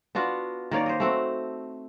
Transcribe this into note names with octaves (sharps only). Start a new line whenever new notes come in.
B3 D4 F4 F#4
D#3 A#3 C#5 D5
C5 D#5
A3 C4 F#4